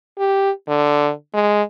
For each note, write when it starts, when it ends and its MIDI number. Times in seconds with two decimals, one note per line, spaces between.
0.18 0.51 67
0.68 1.11 50
1.34 1.62 56